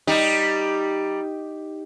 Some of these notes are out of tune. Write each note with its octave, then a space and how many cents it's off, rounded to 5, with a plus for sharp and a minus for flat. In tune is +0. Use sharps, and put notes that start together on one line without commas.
G3 +0 D#4 +0